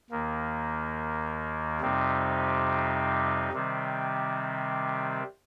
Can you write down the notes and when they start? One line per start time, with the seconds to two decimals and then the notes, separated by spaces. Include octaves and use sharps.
0.10 D#2 D#3 A#3
1.81 F2 C3 G3 C4 D#4
3.52 C3 D#3 G3 C4